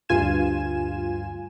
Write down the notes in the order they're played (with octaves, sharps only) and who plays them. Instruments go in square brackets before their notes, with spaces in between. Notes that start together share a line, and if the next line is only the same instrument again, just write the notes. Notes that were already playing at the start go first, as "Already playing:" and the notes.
[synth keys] D2 G2 F4 G#5 E7